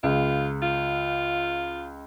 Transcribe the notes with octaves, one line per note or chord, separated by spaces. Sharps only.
C#2 F4
F4